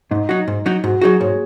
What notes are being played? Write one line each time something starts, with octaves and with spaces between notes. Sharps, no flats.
G#2 D#4
F#3 D#4 F#4
G#2
F#3 D#4 F#4
G#2 F#4
F#3 D#4 F#4 G#4
G#2 C#5